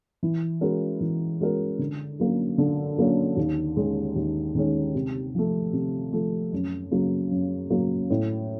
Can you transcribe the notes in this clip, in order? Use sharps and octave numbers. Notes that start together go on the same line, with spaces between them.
E3
G#3 C#4 F#4 A#4
E3
G#3 C#4 F#4 A#4
D3
F#3 A#3 C#4
D3
F#3 A#3 C#4
D#2
D#3 G#3 C#4
D#2
D#3 G#3 C#4
C3
F3 A3
C3
F3 A3
F#2
C#3 F#3 A#3
F#2
C#3 F#3 A#3
A2